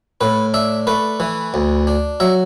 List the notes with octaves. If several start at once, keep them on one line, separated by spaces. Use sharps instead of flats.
A2 B4
D4 E5
A3 B4
E3
D2
D4
F#3 E5